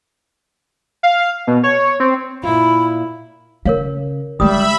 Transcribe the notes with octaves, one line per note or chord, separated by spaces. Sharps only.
F5
B2
C#5
C4
A#2 E4 F4 B5
C#3 A#4 C#5 F5
D3 G3 G#3 E5 B5 D#6